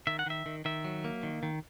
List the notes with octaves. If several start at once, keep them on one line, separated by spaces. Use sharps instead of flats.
D#3 E5
F#5
D#3 E5
D#3
D#3 E5
F#3
A#3
D#3
D#3